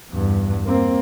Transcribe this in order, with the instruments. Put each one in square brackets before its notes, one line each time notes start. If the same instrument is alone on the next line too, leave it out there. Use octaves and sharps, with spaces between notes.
[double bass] E2 G2
A#3 C4